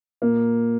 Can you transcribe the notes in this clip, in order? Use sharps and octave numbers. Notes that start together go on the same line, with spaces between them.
A#2 A#3